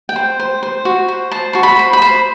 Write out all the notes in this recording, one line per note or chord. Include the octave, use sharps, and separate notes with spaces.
G5
C5
C5
C5
F#4
C5
C5 A5
F#4 C6
B5
C5
B5
C5